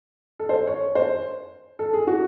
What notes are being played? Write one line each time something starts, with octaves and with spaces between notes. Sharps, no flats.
A4
C5
C#5
C5
A4
G#4
F#4